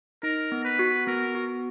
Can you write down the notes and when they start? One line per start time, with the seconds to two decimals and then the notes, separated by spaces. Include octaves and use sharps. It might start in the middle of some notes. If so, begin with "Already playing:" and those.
0.23 D#4 A#4
0.52 B3
0.65 B4
0.79 F#4
1.07 B3 A#4
1.35 F#4